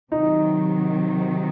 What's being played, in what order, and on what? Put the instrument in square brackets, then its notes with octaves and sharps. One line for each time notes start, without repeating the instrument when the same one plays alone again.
[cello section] C3 D#3 F#3 [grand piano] D#4